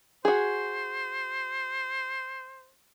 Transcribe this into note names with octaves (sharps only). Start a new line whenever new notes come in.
F#4 G#4 C5